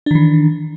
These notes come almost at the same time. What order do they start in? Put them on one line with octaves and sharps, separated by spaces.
D4 D#3 E3